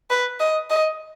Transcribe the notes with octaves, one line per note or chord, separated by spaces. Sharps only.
B4
D#5
D#5